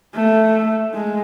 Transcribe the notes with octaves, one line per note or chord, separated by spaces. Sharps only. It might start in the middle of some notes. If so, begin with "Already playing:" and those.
A3
G#3